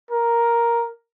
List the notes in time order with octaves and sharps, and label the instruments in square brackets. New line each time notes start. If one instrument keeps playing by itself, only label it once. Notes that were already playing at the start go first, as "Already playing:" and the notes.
[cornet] A#4